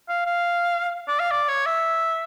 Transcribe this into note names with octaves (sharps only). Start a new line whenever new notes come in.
F5
F5
D5
F5
D5
C#5
E5